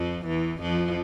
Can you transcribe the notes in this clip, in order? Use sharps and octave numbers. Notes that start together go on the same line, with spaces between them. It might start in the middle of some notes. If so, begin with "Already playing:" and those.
Already playing: F2 F3
E2 E3
F2 F3